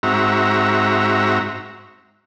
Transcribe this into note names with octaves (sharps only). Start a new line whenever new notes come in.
G#2 C4 F#4 E5 A#5